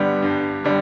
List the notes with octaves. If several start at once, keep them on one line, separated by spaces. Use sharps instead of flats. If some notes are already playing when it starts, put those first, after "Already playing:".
Already playing: G2 D3 G3 B3
G2
D3 G3